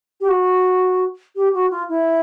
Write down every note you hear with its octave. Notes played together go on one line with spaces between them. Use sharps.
G4
F#4
G4
F#4
F4
E4